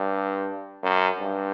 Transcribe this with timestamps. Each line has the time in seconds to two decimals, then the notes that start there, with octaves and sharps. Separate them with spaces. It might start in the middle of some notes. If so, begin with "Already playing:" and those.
Already playing: G2
0.83 F#2
1.19 G2